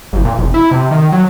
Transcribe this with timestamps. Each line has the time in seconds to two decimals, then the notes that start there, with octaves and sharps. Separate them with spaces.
0.13 G1
0.25 A#2
0.38 F1
0.54 E4
0.71 C3
0.91 D#3
1.12 F#3